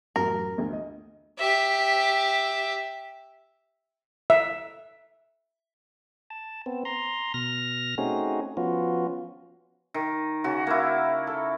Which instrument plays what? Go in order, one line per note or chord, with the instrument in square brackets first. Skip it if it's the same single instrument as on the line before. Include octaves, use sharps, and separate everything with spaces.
[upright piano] A1 F#2 [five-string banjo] A#4
[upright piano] D2
D#5
[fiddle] G4 E5
[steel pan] E5
[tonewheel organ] A5
B3 C4
A#5 C6
B2 F6 A#6
A3 C4 C#4 D#4 F#4 G#4
F3 B3 C#4 F4 F#4
[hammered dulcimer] D#3
C#3 F#4
A#3 E4
A4